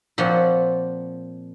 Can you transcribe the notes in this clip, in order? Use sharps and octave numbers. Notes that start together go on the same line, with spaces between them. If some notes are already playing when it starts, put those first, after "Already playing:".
A#2 F3 C4 C#5 F#5